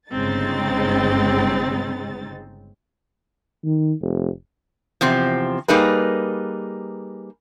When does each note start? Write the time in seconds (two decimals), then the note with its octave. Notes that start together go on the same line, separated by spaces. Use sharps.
0.11 G1 C#3 G#3 C4 D#4 A6
3.65 D#3
4.01 F1
5.01 E2 C3 F3 C4
5.68 G3 A#3 D#4 G#4 B4